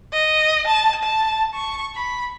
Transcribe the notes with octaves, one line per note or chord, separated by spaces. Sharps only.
D#5
A5
A5
C#6
B5